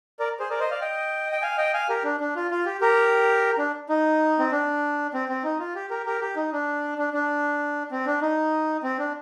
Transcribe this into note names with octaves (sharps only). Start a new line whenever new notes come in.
A#4 D5
G#4 C5
A#4 D5
C5 D#5
D5 F5
D#5 G5
G5
F5 G#5
D#5 G5
F5 G#5
G4 A#4
D4
D4
F4
F4
G4
G4 A#4
D4
D#4
C4
D4
C4
C4
D#4
F4
G4
G4 A#4
G4 A#4
G4
D#4
D4
D4
D4
C4
D4
D#4
C4
D4